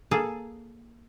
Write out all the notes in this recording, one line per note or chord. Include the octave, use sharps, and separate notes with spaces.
A#3 G#4 A4